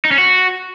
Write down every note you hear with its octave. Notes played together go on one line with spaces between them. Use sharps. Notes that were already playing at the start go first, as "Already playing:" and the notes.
D#4
C#4
F#4